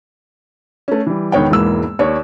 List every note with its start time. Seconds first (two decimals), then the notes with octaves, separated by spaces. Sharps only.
0.88 A3 C#4
1.06 E3 G3
1.32 E1 D#3 B3 C#5 G5
1.50 E1 G#2 E3 A#3 E6
1.99 D#2 C#5 D5